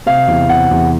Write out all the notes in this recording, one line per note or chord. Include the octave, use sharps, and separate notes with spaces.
C3 F5
E2
C3 F#5
E2